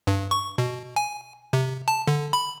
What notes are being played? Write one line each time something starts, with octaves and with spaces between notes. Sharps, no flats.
G2
C#6
B2
G#5
C3
A5
D3
B5